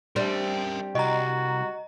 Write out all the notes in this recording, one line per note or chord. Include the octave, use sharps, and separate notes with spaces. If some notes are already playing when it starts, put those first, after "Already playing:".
G3 C4 D4 A#4 E5
C2 F#4 D#5 A#5